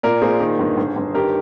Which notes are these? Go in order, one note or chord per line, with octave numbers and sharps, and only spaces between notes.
A#2 A#4 D5
A#2 G#4 C5
D#3
G1
G1
G1
D#3 G4 A#4